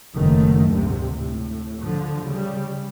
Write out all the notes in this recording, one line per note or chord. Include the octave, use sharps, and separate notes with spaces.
F#1 D#3 A3
D2 G#2 C3
A2
D3 F3
C#3 G3